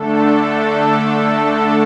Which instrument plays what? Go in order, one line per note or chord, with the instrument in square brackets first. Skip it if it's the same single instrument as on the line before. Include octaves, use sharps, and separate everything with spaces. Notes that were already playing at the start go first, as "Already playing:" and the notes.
Already playing: [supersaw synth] D3 A3 D4 A4